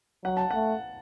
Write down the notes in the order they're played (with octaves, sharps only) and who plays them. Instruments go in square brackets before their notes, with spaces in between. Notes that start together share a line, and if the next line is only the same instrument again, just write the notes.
[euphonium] F#3 [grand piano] F#5
[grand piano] A5
[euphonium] A3 [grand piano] F#5